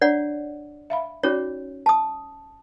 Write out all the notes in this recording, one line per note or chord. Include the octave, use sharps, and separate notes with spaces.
D4 C#5 D5 F#5
E5 F5 B5
C#4 D#4 F#4 C#5 D5
A5 D#6